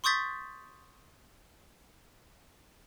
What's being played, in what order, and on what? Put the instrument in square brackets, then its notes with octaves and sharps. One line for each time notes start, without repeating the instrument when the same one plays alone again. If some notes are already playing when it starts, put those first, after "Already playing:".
[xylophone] C6 C#6 D#6 G6 A6 B6